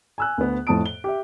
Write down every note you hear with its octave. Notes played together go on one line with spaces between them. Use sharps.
G#5 E6 F#6
D2 B3
F2 A2 A5 D#6 D7
G7
G4 E5